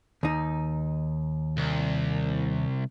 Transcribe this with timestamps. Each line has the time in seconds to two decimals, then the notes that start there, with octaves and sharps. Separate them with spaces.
0.23 D#2 D#4
1.58 C2